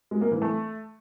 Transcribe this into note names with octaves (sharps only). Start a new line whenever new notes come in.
G#3
A#3
E3
A3